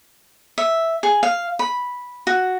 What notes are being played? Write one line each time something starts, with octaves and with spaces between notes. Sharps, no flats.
E5
G#4
F5
B5
F#4